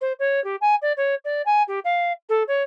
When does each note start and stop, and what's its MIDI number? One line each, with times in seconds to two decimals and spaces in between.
0.01 0.12 72
0.19 0.42 73
0.44 0.56 67
0.61 0.75 80
0.81 0.92 74
0.96 1.14 73
1.24 1.42 74
1.45 1.62 80
1.67 1.79 67
1.84 2.12 77
2.29 2.43 69
2.47 2.62 73